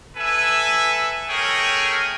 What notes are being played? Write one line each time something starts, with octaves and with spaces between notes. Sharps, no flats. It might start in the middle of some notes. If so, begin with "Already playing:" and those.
A4 B4 E5 G#5
A3 G#4 A#4 C#5 G5